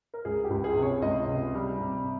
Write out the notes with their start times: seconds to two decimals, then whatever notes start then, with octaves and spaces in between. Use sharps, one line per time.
0.14 A#4
0.25 C#2 G#4
0.44 G4
0.50 C#2
0.64 G#4
0.77 C3
0.82 C#5
1.02 C#2 D#5
1.28 C3
1.54 G3
1.80 C3